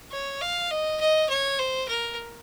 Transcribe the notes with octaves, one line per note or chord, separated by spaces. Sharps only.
C#5
F5
D#5
D#5
C#5
C5
A#4